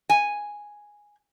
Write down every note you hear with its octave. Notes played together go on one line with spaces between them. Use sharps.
G#5